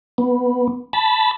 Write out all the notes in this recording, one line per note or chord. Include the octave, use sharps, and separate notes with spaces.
B3
A5 B5